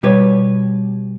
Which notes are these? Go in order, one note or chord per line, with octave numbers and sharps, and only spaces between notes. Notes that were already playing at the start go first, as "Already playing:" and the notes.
B2 G3 G4 B4 C#5